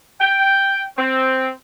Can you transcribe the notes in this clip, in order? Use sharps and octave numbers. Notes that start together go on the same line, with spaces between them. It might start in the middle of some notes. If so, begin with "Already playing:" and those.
G5
C4